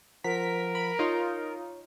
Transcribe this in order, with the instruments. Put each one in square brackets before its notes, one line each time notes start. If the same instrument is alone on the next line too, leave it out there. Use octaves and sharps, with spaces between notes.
[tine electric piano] F3 F#5 A#5 [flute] A#4 [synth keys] B6
[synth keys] B5
[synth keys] D#4 F4 [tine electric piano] C#5